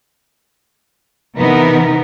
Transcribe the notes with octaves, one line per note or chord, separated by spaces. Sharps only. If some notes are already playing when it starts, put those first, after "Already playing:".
C3 E3 B3 D#4 A#4 B4